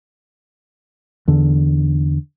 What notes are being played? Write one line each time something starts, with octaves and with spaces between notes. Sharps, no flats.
E2 D3